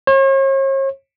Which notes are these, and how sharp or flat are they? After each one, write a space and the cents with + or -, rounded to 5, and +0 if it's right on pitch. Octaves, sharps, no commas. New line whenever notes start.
C#5 -45